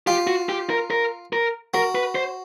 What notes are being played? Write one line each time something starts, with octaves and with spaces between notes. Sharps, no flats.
F4 G4
F#4
G4
A#4
A#4
A#4
F#4 A#4
B4
C5